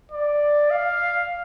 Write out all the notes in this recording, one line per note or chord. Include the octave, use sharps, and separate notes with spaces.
D5
F5